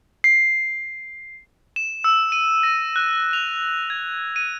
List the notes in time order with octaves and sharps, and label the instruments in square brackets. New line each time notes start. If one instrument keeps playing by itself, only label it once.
[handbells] C7
[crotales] E7
E6
D#7
A#6
F#6
F7
G#6
D#7